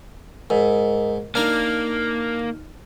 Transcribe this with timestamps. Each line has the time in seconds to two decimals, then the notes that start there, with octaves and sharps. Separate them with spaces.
0.50 G#2 A#4 D#5
1.35 A#3 D4 D#4 A#4 F6